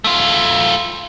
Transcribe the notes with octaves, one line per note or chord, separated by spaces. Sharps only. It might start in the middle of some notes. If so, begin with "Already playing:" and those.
A3 F4